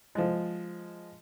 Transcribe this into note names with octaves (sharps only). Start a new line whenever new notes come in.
F3 G#3